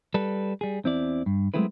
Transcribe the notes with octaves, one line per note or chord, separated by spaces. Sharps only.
G3 A4 B4
G3 G#4
E2 C4 E4 D5
G2
F#3 G#3 A3 C4 E4 B4